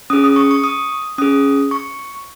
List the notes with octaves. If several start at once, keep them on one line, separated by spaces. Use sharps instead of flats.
C#4 G#4 D#6
D#6
C#6
C#6
D#6
C#4 G#4 D#6
C#6